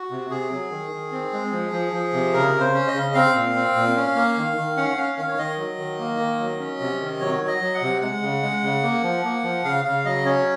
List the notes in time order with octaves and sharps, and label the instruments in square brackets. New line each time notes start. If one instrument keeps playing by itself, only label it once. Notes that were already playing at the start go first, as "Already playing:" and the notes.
Already playing: [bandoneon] F#4
C3
C3 G#4
F#3
D#3
D#3
C4
G#3
F3
F3
F3
C3
C#3 A#4
C#3
C5
C#4
D#5
C#3
C4 F5
A#2
C4
A#2
C#4
A#3
D#3
D#3
C#4 F#5
C#4 F5
D#3 F5
C#5
D#3 D#5
F#3
D#3
A#3
D#3
F#3
C#4
C3
D#3
F#3 C#5
F#3
D#5
F#3
F#5
C3
G#3 F#5
C#3
G#3
C#3
A#3
F3
A#3
F3
C#3 F5
C#3 F5
F#3 D#5
C#4 C#5